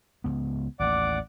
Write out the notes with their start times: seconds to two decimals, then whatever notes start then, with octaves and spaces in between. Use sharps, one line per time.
0.24 C#2 B3
0.80 A1 D#2 D5 F#5 D6